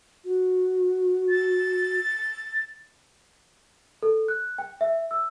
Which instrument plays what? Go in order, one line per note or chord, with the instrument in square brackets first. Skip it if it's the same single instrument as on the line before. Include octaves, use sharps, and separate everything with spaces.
[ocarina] F#4
[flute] A6
[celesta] A4
F#6
G5
E5
E6